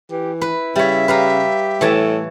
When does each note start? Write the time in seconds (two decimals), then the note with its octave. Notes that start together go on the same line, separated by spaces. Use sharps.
0.11 E3 G4
0.41 E4 B4
0.76 C#3 G3 C#5 E5
1.08 G4 B4 F5 A#5
1.81 A2 E3 C#5 A5